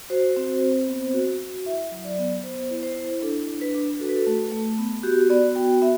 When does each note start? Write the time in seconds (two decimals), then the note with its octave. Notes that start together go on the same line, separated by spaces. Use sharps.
0.10 F#4 C5
0.37 C4
0.62 C4
0.88 B3
1.14 F#4
1.40 F#4
1.66 E4 E5
1.91 F#3
2.05 D5
2.18 B3
2.44 B3 C5
2.71 E4
2.83 C5
2.96 E4
3.22 D4 A4
3.48 D4
3.61 B4
3.75 D4
4.00 F#4 A4
4.09 B4
4.17 A4
4.27 A3
4.52 A3
4.78 B3
5.03 F#4 G4
5.30 B3 D5
5.56 F#4 G5
5.82 B3 E5